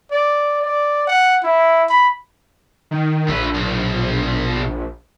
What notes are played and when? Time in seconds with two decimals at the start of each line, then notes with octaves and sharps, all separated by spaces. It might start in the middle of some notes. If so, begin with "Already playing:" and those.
0.12 D5
0.62 D5
1.07 F#5
1.44 E4
1.89 B5
2.91 D#3
3.29 A#1 A3 B4
3.55 B1